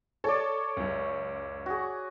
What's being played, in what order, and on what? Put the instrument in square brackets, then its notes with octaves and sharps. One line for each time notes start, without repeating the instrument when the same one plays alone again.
[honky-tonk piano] A4 [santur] C#5 D5
[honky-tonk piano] C#2 F#2
[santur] F#4 G#4